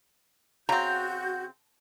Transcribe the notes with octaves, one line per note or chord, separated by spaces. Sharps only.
C#3 C4 F#4 A#5 G6